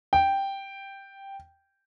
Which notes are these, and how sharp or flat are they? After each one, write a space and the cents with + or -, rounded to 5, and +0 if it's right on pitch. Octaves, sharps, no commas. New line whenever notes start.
G5 +0